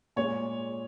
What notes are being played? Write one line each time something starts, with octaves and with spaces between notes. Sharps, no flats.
A#2 G#3 C#5